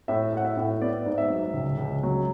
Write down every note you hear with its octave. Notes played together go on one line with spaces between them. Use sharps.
A2 E5
A2 F#5
E5
A2
B3 D5
G#2
E5
F#3
C#2
C#2
F#3